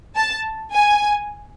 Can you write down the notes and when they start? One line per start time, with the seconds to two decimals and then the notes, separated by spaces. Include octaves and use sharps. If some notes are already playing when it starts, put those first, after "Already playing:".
0.16 A5
0.73 G#5